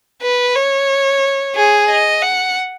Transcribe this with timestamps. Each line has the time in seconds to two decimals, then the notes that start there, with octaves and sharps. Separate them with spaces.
0.22 B4
0.56 C#5
1.55 G#4
1.89 D#5
2.22 F#5